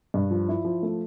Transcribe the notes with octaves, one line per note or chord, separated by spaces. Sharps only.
G2
F3
E4
F3
A3